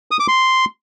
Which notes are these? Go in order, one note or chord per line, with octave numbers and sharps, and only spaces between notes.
D#6
D6
C6